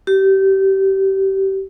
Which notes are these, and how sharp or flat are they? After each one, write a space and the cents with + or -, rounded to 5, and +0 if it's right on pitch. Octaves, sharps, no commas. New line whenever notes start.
G4 -25